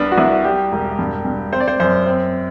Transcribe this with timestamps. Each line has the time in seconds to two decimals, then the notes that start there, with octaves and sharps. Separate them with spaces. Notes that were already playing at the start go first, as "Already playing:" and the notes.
Already playing: C2 B3 D4
0.12 F#4
0.17 C2 E4
0.44 G3 G4
0.72 E1
0.99 G2
1.25 G2
1.52 C4 C5
1.60 D5
1.68 C5
1.80 F#2 C5
2.07 C4